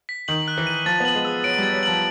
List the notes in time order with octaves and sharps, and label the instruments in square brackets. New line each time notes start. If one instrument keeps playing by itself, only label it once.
[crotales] B6
[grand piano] D#3 [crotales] F#7
[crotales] F#6
[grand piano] E3
[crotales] D#7
[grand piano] F3 [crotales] A6
[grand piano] B3 [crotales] F#7
[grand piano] G#3
[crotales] E6
[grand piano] F#3 [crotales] D7
[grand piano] G3 [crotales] A6
[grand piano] F#3
[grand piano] F3 [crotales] F#7